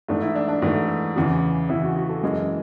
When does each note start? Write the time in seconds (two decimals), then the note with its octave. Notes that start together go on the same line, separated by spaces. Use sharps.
0.08 G#2 E3 A3 D4
0.22 E4
0.35 D4
0.48 D4
0.62 G#2 E3 A3
1.16 E2 C#3 E3
1.69 E2 C#3 E3 E4
1.82 F#4
1.96 F#4
2.09 A4
2.23 F#2 E3 G#3 C#4